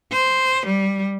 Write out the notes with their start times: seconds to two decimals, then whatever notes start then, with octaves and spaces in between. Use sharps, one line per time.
0.13 C5
0.66 G3